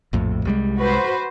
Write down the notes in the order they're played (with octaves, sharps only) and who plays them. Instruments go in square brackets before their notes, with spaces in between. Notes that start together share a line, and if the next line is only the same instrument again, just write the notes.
[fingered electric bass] A#1 F2 A2
C2 G3 G#3
[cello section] F#4 B4 C5